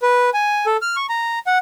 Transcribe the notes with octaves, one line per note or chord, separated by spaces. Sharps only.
B4
G#5
A4
F6
C#6
A#5
F#5